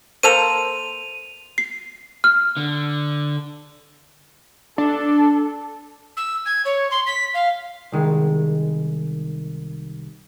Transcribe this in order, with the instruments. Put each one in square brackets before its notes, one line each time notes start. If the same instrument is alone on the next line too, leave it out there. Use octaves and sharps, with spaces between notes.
[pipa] A#3 A4 C5 [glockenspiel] D#7 F7
[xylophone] C7
F6
[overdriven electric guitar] D3
[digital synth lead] D4 [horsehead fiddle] A4
[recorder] E6
G#6
C#5
C6
B6
F5
[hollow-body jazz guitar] C2 D#3 G#3